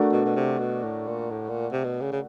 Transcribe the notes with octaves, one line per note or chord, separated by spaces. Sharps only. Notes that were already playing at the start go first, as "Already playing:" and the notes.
Already playing: A3 D4 F#4 A#4 D5
B2
B2
C3
B2
A2
A#2
A2
A#2
C3
B2
C#3
C#3